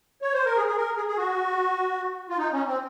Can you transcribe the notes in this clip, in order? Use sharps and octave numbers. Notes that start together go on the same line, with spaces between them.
C#5
C5
A#4
G#4
G#4
A#4
G#4
G#4
F#4
F4
D#4
C#4
C4